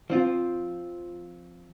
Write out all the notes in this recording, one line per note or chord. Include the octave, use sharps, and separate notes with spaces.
F3 C4 F4